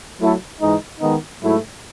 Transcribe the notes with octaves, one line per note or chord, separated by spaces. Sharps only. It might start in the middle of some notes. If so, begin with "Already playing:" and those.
F#3 A3 E4 A4
G#2 E3 G#3 D#4
D#3 G#3 B3 D#4
G#2 F#3 A3 E4